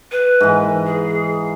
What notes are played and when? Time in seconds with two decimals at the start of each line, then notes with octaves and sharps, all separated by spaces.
0.12 B4
0.40 G#2 E3
0.86 G#4